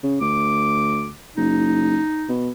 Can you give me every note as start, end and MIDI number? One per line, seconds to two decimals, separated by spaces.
0.03 0.17 49
0.21 1.12 38
0.21 1.09 86
1.37 1.99 30
1.37 2.31 63
2.29 2.51 47